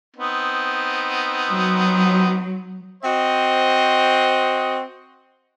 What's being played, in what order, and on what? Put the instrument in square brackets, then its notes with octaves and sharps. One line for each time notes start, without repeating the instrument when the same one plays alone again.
[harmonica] B3 C4 D#4
[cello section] F#3
[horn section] C4 F#4 C5 D#5